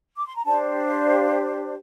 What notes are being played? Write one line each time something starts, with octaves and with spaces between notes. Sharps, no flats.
D6
C6
A#5
D4 G4 C5 A5
F5